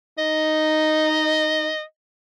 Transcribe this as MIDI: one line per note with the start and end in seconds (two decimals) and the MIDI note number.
0.19 1.70 63
0.19 1.82 75